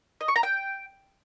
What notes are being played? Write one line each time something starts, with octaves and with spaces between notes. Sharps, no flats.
D#5
C#6
A#5
G5